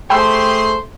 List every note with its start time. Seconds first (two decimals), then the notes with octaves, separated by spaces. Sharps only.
0.10 A3 G4 G#4 C5 G5 B5 C6 E6